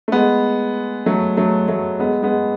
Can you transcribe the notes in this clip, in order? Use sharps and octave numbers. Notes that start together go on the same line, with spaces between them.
A3
G#3 B3
F#3 A3
F#3 A3
F#3 A3
G#3 B3
G#3 B3